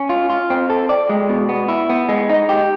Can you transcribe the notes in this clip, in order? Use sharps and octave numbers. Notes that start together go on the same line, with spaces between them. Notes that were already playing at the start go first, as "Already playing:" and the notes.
Already playing: C#4
F4
F4
C4
A4
D5
G#3
B2
B3
E4
B3
G#3
D#4
G4